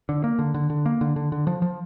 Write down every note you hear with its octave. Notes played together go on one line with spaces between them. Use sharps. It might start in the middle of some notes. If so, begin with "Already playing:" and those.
D3
A#3
D3
D3
D3
A#3
D3
D3
D3
F3
F3